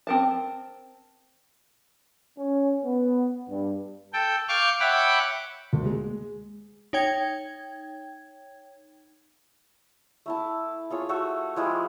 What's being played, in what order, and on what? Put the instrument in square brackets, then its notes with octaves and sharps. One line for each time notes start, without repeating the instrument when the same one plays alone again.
[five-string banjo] C4 A#4 A5
[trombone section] C#4
B3
G2
[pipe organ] A4 G5
F5 C#6 D6 F6 G6
C#5 E5 F#5 G5 B5 D6
[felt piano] D2
G#3
[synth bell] D#4 C#5 G5 G#6
[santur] A3 E4 A5
F4 G#4 C#5
A3 F#4 A4
F3 G#3 E4 G4